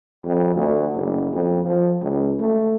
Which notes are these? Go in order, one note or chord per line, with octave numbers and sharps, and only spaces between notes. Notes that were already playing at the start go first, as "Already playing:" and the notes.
F2
D2
F#1
F2
F3
C#2
A3